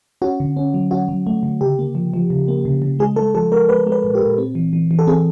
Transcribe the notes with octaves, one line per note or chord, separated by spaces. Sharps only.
C#4 F#4
D3
C#4
F#3
C#4 F#4
F#3
A3
D3
C#3 G4
A#3
F3
F3
C#3
A#3
C#3
C#3
G#3 G#4
G#3 A4
F3 A4
G#3 A#4
G#3 B4
G#3
B4
A#2
G4
A#2
C4
E3
E3
E3
A4
C4 G#4